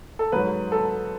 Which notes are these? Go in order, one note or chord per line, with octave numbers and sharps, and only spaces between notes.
A4
G#2 F#3 B4
A4